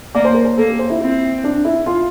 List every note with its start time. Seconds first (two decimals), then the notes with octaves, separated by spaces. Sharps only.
0.15 A#3 D5
0.25 C5
0.34 A#4
0.45 C5
0.57 A#3 A4
0.69 G4
0.79 C5
0.90 E4
1.01 C4 E4
1.44 D4
1.65 E4
1.86 F4